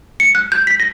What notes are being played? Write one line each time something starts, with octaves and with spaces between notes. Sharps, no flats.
C#7
F#6
G6
B6
A#6